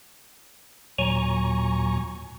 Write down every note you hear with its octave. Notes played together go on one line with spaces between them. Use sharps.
D#2 A#2 F#3 G#5 A#5 C#6